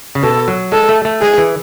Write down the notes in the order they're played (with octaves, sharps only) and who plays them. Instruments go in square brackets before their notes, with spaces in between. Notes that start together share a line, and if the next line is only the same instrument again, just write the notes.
[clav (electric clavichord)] C#3
[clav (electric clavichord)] B2 [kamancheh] A4
[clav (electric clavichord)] F#3
[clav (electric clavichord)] G#3 [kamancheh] A4
[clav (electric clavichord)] A3
A3
[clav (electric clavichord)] G#3 [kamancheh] G#4
[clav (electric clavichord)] E3